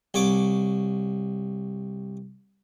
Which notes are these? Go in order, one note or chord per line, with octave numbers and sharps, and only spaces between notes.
C2 C#5 D6